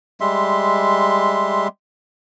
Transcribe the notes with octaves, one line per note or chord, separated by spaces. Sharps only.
G3 G#3 E5 C6